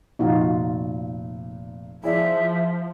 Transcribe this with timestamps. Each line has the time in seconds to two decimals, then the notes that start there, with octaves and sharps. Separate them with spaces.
0.19 F1 A#2 D#4 F4 F#4
2.04 F3 E4 G#4 D5 E5